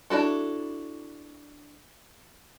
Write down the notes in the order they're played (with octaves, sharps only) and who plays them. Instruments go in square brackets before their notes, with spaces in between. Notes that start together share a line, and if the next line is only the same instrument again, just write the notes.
[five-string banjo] D4 E4 F#4 A4